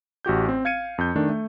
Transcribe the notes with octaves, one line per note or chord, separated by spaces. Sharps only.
A1 F#4 G4 G6
C4
F5 G#6 C#7 D#7
F2 G6
D#3 A3 D4
A3